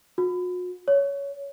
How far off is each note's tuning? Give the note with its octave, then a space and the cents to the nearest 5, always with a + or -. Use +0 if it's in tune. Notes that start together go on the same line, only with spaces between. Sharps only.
F#4 -45
C#5 +15